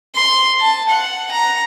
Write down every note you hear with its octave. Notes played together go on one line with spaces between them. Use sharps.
C6
A5
F#5
A#5